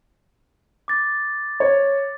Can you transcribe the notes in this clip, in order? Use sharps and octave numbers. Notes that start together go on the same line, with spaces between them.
D6 A6
C#5